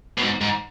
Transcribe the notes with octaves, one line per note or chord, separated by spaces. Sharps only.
B2
G#2
G#2